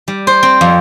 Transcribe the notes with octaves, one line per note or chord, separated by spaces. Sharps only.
G3
C5
C4
F2